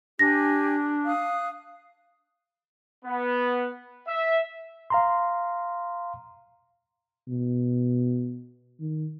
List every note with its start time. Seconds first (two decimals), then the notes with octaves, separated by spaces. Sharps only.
0.19 D4 G4 G#5 A#6
1.05 F5 D#6 F#6
3.05 B3
4.07 E5
4.90 F5 A#5 C6
7.28 B2
8.80 D#3